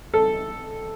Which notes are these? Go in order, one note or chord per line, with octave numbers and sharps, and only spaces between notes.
A4